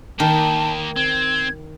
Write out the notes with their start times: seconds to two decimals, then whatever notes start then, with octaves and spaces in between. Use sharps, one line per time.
0.20 D#3 A#3 G5 A5
0.96 C4 G#6